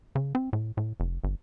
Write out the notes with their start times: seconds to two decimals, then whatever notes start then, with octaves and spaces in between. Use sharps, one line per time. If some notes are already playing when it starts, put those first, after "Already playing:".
0.15 C#3
0.35 C4
0.53 A2
0.77 A2
1.00 F1
1.24 G1